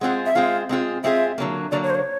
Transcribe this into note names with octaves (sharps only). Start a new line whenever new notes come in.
G#3 C4 F4 G#4 F#5
E5
G#3 C4 F4 G#4 F5
G#3 C4 F4 G#4
G#3 C4 F4 G#4 E5
D3 F#3 A#3
D3 F#3 A#3 D5
C#5
C5
C#5